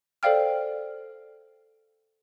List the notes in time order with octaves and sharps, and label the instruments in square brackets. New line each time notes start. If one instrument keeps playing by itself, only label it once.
[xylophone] A4 C5 D5 F5 G5 F6